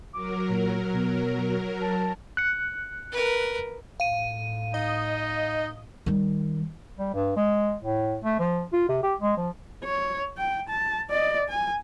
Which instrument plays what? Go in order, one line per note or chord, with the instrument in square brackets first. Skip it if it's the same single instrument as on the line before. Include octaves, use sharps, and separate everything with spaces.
[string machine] F#3 A#4 [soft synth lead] D6
[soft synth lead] A#2
B2
A5
[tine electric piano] F#6 C#7
[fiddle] A#4 B4
[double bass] A2 [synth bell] F5 D#7
[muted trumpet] D#4 [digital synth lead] D#5
[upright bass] D#3 G3
[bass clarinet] G3
G2
G#3
A2
A3
F3
F4
C3
G4
G#3
F3
[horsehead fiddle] C#5
G5
A5
D5 D#5
G#5